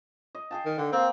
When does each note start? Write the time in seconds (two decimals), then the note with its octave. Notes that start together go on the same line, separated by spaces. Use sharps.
0.35 D#5
0.51 G#4 G5 A5
0.65 D#3
0.78 D3 G5
0.92 A#3 C4 G#4